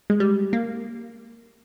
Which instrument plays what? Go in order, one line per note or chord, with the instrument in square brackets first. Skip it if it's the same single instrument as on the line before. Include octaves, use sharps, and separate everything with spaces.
[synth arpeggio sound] G#3
G3
A#3